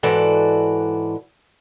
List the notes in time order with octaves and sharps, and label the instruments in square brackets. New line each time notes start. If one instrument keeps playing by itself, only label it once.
[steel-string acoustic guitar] G#2 E3 F#4 A4 D5